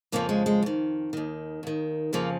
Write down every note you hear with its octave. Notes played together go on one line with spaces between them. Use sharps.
F2 C#3 F3 A#3
G#3
G#3
F2 D#3
D#2 D#3
D#2 D#3
F2 C#3 F3 A#3